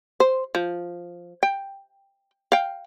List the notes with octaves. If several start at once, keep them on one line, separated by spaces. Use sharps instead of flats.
C5
F3
G5
F5 G5